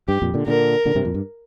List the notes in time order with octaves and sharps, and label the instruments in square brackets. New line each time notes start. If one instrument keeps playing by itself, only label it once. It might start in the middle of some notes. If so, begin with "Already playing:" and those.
[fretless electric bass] G2 [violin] G4
[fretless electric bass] F2 A#2
A#2 D3
[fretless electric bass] A#2 D3 [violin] A#4
[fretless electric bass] A#2 D3
G2 C3
F2 A#2
G2